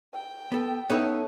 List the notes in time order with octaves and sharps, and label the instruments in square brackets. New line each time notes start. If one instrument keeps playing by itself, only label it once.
[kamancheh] G5
[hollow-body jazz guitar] B3 A4
[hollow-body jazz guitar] B3 D#4 C#5 [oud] C#4 E4 A4